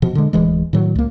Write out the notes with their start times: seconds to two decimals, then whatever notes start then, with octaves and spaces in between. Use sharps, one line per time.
0.02 B2 F3
0.15 D3 G#3
0.33 D1 E3 G#3
0.73 A2 D#3 F#3
0.95 C#2 A#3